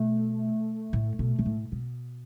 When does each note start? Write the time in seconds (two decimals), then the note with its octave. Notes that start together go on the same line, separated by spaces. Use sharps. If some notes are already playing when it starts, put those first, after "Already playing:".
Already playing: B2 A3
0.93 A2
1.19 B2
1.39 B2
1.46 A2
1.72 B2